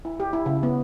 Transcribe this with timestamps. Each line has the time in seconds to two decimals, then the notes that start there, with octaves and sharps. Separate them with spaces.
0.05 E4
0.20 G4
0.33 E4
0.46 C#3
0.63 B3